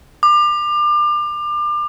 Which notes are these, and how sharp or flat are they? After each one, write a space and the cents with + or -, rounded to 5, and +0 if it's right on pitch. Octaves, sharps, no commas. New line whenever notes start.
D6 +30